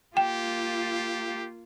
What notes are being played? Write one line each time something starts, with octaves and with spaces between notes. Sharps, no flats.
A#3 F4 G4 G5